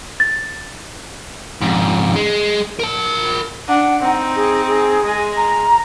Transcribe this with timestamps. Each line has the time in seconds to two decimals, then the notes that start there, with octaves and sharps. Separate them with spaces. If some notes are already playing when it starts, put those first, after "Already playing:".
0.20 A6
1.61 F2 G#2
2.16 G#3
2.79 A#4 A5
3.68 D4 F#5
4.00 C4 D#4
4.35 G#4
4.66 G#4
5.04 G#3
5.36 A#5